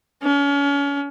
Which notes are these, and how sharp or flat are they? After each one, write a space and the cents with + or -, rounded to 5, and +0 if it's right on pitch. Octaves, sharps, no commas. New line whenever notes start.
C#4 +35